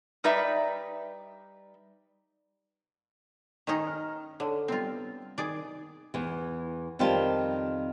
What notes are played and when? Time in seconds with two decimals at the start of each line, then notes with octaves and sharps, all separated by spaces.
0.24 G3 D#4 B4 D5 E5
3.67 D#3 C#4 D#4
3.87 F6
4.40 D3 C#5
4.68 G3 B3 C4 F4
5.38 D#3 G#4 D5
6.14 E2 E3
6.99 F2 D#3 G3 C4 F4 A5